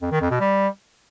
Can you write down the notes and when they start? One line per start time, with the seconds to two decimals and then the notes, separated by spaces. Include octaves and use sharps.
0.02 F2
0.11 D#3
0.21 F2
0.30 B2
0.40 G3